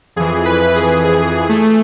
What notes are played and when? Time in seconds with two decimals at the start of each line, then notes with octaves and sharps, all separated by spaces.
0.16 F2 E3 G#4
0.45 B4
0.75 G#4
1.05 G#4
1.49 A3